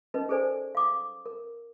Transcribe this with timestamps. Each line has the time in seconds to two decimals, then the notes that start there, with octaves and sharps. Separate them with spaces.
0.14 C#4 D#4 A#4 B4 D#5
0.29 G#4 A4 C5 D5 G#5
0.75 F5 D6 D#6
1.26 A#4